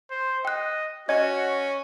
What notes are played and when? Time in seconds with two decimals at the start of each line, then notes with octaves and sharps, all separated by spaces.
0.11 C5
0.45 D#5 G5 F#6
1.09 C#4 F#4 D#5